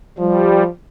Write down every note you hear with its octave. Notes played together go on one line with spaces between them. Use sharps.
F3 G3